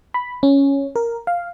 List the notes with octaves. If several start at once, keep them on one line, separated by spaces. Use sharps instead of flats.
B5
C#4
A#4
F5